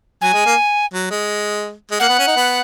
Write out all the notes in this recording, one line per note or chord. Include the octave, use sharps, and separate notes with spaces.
F#3 G#5
G#3
A#3
F#3
G#3
G#3
A#3 F#5
B3
C#4
D#4
B3